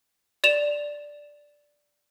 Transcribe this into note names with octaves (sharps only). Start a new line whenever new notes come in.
D5 E7 F7